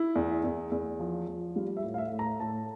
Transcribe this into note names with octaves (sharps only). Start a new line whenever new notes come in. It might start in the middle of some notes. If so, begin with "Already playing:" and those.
Already playing: E4
E2
E2
E2
F3
F3
G3 F4
E5
A2
F5
E5
A2
A#5
A2 A5